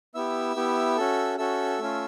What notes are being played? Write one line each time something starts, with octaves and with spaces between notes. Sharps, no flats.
B3 E4 G4 E5 E6
B3 E4 G4
C#4 F#4 A4
C#4 F#4 A4 E5 E6
A3 C#4 F4